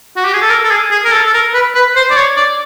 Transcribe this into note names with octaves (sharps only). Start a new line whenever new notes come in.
F#4
G4
G#4
A4
A#4
A4
G#4
G#4
A#4
A4
A4
A#4
B4
B4
C5
D5
C#5
D5